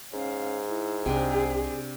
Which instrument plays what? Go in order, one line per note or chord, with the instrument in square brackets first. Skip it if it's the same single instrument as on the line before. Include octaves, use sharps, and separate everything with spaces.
[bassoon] G#2 [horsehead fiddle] C#4 F5
[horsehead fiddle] E4
[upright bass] C2 [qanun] C3 D4 [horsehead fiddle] G#4